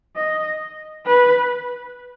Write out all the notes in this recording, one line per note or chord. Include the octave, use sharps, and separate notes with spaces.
D#5
B4